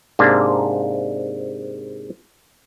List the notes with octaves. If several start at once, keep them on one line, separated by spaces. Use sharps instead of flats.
G#2 C3 A#3 D4